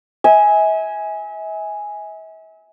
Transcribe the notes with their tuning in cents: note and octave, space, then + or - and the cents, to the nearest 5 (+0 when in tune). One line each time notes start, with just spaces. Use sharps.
E5 -40 G#5 +0